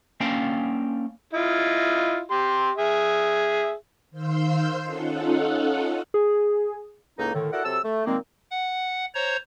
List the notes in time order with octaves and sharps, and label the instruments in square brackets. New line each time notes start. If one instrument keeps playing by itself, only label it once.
[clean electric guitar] A#3 C#4 D4 F5 G5
[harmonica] E4 F4 D#5
G4 C6
G#4 E5
[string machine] D#3 C5 F5 C6 E6 G6
C#4 D#4 F4 A4 F#5
[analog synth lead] G#4
[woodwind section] C#2 A2 A#3 D#4
A2 D3 D#3
E4 F#4 A4 A#4 D5 F#5
C3 F#3 A4 A5 E6
A3
A#2 D#3 G#3 A#3 C4
[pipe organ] F#5
C5 C#5 A#5